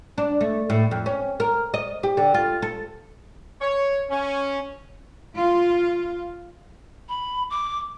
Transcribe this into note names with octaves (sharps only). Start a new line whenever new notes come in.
D4
A3
A2
F2
C#4
A#4
D#5
G4
D3
F4
A4
C#5
C#4
F4
B5
D6